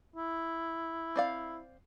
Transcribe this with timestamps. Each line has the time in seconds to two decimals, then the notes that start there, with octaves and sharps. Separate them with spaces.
0.16 E4
1.16 C4 D5 F5